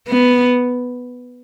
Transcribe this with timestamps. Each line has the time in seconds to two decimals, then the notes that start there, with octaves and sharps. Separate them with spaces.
0.08 B3